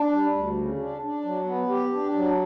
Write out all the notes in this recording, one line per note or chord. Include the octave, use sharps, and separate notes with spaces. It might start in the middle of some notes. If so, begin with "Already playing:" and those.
Already playing: D4
G3
D2
C#3
D4
D4
F#3
B3
G4
D4
F#3